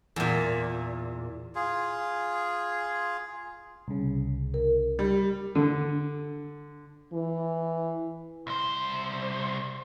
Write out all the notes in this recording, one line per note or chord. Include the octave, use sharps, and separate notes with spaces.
E2 A#2
F4 G#4
C2 C#3
A#4
G3
D3
E3
C2 C5